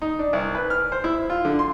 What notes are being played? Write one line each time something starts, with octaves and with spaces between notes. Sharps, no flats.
D#4
D4
C2
B4
F6
C5
E4
F4
D3
C6